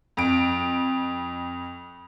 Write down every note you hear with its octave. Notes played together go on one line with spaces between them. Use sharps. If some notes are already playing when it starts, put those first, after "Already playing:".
F2 D7